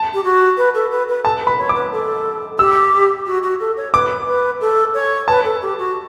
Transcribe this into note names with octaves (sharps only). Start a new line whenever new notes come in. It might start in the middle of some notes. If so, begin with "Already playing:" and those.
Already playing: A5
G4
F#4
B4
A4
B4
B4
A4 A5
B4
B5
C#5
D6
B4
A4
G4 E6
F#4
F#4
A4
C#5
B4 D6
B4
A4
C#5
B4 A5
A4
G4
F#4